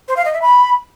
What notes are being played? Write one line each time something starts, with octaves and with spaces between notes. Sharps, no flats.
C5
F5
D#5
E5
B5